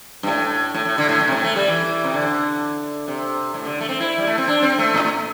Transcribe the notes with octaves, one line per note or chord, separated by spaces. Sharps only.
G2
A2
A2
A2
D3
A2
G2
C3
A2
A3
G3
E3
C3
D3
C3
A2
D3
A3
C4
E4
G3
A3
C4
D4
C4
A3
A2
A2